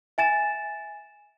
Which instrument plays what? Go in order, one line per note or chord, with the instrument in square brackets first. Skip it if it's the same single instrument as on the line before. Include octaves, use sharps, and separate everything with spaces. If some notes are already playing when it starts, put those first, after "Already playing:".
[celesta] E5 G#5 A6 E7